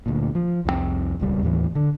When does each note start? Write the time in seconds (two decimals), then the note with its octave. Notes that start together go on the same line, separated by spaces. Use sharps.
0.06 D2 A#2
0.35 F3
0.65 C2 F2 F3 C4
1.20 D#1 C#2 G3
1.42 D#2 A2 E3
1.75 D3